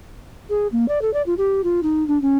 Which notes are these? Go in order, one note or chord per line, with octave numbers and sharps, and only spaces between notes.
G#4
A#3
D5
A4
D5
F4
G4
F4
D#4
D4
C#4